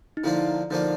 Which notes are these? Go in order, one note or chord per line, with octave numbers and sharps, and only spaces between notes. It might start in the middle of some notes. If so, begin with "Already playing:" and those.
D#4
D3 F3 A#3 D4 E4 F4
D3 F3 A#3 D4 D#4 F4